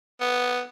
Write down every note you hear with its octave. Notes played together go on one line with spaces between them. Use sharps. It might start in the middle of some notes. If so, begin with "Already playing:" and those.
B3